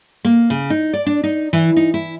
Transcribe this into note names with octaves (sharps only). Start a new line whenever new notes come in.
A#3
C#3
D#4
D5
D4
D#4
E3
D#4
E4